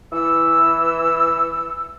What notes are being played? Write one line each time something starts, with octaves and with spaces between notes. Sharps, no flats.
E3 E6